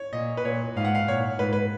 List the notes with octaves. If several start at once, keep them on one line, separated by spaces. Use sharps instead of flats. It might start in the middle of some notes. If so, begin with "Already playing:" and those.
Already playing: C#5
A#2 D#5
B4
A#2 C#5
G#2 F5
F#5
F5
A#2 C#5
G#2 B4
B4